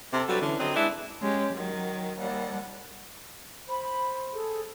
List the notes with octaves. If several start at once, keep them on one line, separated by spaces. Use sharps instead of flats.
C3 A4
F#3 G3 D4 F#4 A4 B4
D3 E3 C#4
D3 F#3 C4 D#5
G#3 D4 E4 B4
G#3 C#4 G4
D#3 F#3
D#2 G3 F#5
C5 B5
G#4 A4